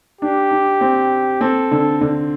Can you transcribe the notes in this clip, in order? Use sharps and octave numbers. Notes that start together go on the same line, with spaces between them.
D4 G4
D4
C4
C4 A4
D3
D3